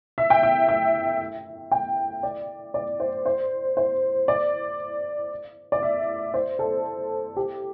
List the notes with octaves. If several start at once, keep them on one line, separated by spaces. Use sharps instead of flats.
E5
G5
E5
E5
G5
D5
D5
C5
C5
C5
D5
D5
E5
C5
A4
G4